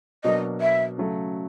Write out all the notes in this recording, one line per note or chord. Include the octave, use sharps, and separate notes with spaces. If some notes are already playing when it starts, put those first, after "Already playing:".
B2 F#3 A#3 D4 D#5
E5
C#3 F#3 A3